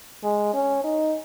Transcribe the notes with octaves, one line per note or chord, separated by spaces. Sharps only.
G#3
C#4
D#4